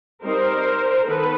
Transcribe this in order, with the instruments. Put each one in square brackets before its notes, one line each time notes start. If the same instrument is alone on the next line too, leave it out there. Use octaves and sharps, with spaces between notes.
[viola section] G3 C4 D#4 A#4 C5
D#3 B3 A4 B4